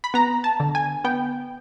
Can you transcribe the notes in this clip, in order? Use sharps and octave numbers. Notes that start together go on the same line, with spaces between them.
B5
B3 A#5
A5
D3
G#5
B3 G5